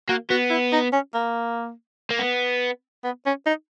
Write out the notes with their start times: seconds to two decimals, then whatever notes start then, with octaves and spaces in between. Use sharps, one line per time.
0.09 A#3 F#4
0.30 B3 F#4
0.50 E4
0.72 D#4
0.93 C#4
1.14 A#3
2.11 A#3
2.19 B3
3.04 B3
3.26 C#4
3.46 D#4